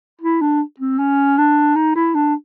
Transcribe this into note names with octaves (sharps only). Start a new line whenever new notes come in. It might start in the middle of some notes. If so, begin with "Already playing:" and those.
E4
D4
C4
C#4
D4
D#4
E4
D4